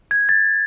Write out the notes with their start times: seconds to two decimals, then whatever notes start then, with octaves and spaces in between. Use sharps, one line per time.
0.11 G#6
0.29 A6